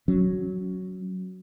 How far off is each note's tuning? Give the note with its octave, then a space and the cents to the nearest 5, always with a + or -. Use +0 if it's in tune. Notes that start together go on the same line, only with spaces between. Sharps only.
F#3 +0 C#4 +0